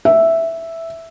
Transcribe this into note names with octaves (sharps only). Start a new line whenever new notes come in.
E5